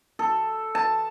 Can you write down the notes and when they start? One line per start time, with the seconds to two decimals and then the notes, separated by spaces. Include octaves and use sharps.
0.19 A4
0.75 A5